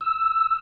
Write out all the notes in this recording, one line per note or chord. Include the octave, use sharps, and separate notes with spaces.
E6